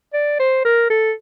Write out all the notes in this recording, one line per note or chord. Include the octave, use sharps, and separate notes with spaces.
D5
C5
A#4
A4